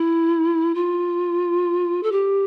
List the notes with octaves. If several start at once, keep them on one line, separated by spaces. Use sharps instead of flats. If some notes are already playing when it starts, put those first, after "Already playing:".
Already playing: E4
F4
A4
G4